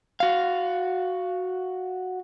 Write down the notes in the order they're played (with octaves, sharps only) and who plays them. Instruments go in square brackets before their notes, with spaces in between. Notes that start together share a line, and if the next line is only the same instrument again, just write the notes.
[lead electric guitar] F#4 F5